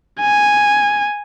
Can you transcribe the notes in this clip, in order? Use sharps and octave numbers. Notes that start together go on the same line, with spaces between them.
G#5